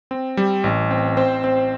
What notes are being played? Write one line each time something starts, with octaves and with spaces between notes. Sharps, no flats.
C4
G3
A1
C4
C4 C5
C4